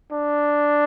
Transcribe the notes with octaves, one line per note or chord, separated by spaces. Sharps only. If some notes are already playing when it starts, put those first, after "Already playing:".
D4